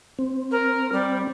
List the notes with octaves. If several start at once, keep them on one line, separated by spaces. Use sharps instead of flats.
C4
A#4
G3